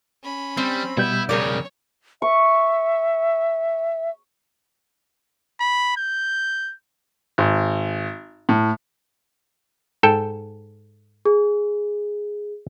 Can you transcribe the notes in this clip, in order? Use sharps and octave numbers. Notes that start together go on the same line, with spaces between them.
C#4 B5
G3 C4
B2 G3 B3 E4 G6
F2 C#3 G#4 A#4 C#5 D5
E5 C#6
B5
G6
G#1
A2
G#2 A4 G5
G#4